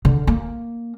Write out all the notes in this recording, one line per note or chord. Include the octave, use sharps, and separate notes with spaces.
D3
A#3